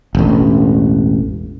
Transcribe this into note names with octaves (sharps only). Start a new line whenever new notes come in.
E1 A1